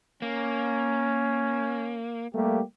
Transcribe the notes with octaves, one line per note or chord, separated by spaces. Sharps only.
A#3 C#4
G3 A3 A#3 G4